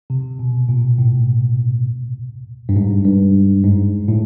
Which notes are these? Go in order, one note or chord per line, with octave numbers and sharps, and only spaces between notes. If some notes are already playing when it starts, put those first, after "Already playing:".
C3
B2
A#2
A2
G2
G#2
G2
G#2
A2